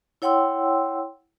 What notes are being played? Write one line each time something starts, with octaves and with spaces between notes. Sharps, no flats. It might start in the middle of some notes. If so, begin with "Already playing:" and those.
E4 C#5 F#5 G5 C6 E6